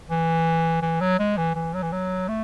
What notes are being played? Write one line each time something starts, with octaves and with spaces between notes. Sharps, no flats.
E3
E3
F#3
G#3
E3
E3
F#3
E3
F#3
A3